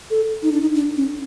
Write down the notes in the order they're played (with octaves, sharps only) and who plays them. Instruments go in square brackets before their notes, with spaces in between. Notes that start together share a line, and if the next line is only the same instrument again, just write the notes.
[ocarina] A4
D#4
D4
D#4
D4
C#4